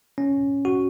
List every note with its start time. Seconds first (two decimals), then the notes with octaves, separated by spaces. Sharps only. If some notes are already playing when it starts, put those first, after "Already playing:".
0.18 C#4
0.65 F#4